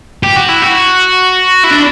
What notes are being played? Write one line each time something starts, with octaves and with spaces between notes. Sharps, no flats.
G4
F#4
E4
F#4
E4
D4